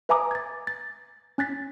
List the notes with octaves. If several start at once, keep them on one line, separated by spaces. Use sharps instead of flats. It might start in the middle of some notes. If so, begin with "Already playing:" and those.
B4 E5 G#5 A#5 D6 D#6
G#6 A6
A6
C#4 F#6 A6 B6